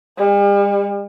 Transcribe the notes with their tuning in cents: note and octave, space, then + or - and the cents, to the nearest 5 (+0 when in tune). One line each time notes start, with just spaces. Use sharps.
G3 +45